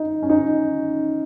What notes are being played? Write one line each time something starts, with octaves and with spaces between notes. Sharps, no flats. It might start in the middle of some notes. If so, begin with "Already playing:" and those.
Already playing: D#4
C#4
D#4